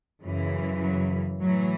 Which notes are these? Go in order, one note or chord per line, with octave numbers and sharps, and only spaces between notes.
F#2 C#3 E3
F#3
A2 E3 F#3